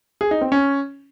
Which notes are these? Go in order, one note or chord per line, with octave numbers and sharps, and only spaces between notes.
G#4
D#4
C4
C#4